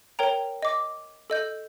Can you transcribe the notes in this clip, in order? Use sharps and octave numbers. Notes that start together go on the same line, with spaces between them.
A#4 C#5 G5 A#5
D#5 D6
A4 D#5 G6